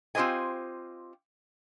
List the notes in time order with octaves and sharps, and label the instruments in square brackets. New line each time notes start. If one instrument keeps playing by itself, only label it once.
[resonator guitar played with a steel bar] C4 F4 G4 C5 D#5 G#5